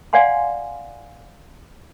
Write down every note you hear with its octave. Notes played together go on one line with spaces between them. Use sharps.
D5 F5 F#5 G#5 C6